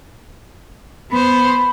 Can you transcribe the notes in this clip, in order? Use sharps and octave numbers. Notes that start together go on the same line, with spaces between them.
B3 C5 B5